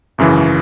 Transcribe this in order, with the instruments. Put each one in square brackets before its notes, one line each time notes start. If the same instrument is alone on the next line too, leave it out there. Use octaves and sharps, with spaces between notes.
[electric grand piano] G#1 F#2 C#3 E3